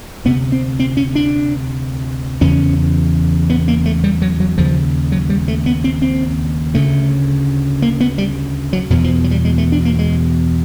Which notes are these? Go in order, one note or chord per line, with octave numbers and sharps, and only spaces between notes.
D2 C3 B3
C4
C4
C#4
D4
E2 C#3 C#4
B3
A#3
A3
G3
F#3
F#3
D#2 C#3 F3
F#3
G3
A3
B3
C4
C4
D2 C#3 A3
A#3
B3
G3
F#3
E2 B2 F#3
F3
F#3
G3
G#3
A3
D4
A#3
G#3